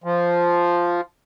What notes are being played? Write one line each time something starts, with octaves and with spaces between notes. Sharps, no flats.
F3